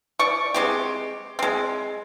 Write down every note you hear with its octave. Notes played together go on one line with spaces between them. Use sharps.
D5 C#6
G#3 C4 G4
G#3 C4